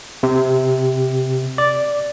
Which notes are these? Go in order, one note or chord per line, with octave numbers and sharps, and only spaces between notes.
C3
D5